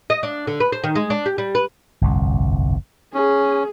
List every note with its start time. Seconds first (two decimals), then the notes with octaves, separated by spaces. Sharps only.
0.10 D#5
0.23 D4
0.47 D3
0.60 B4
0.72 C5
0.84 D#3
0.96 G#3
1.10 D4
1.26 G4
1.38 G3
1.55 B4
2.01 G1 C2 F2
3.14 C#4 G#4